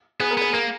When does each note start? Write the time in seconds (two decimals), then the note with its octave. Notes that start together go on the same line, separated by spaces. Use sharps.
0.20 B3 G#4
0.31 A#4
0.37 B3 G#4
0.53 A#3 A#4